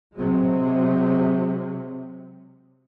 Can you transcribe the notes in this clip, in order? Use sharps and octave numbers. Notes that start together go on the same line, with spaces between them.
C3 F#3 G#3